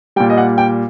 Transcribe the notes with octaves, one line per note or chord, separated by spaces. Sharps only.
A#2 G3 G5
D#5
F#5
G5